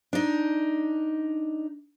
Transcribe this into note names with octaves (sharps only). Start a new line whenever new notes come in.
D4 D#4